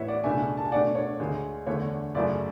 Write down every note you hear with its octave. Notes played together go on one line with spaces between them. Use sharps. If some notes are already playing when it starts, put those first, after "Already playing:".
Already playing: A2 E3 B3 C#5 E5
D5 F#5
C#2 B2 A3 D4 E5 G#5
A5
G#5
B2 A3 D4 D5 F#5
C#5
D2 D3 G#3
E2 D3 A3 D4 C#5
F#2 C#3 F#3 A3 E4 D5